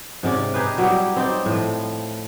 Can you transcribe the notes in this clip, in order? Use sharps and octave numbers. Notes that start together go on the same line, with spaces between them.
G#2 C3 C#4 D5
D#4 G4 G#4 B4
F#3 G3 E4 G4
C4 D#4 D5
A2 F3